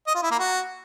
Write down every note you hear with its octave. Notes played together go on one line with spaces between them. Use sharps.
D#5
F4
E4
A#3
F#4